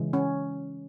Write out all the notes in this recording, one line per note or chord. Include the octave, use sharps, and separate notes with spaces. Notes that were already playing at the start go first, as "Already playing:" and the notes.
Already playing: C#3 E3 G#3
C#4